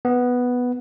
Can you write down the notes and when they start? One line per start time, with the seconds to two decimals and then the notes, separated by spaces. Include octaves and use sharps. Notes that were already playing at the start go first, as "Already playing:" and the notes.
0.05 B3